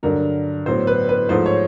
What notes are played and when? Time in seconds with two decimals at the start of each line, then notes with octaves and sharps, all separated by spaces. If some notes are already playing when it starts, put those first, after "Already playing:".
0.03 G2 D3 F#3 A#4
0.66 A2 F#3 B3 C5
0.87 B4
1.09 B4
1.29 G#2 F3 A3 C5
1.46 C#5